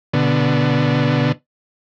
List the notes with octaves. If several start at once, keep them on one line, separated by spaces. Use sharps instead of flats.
B2 D3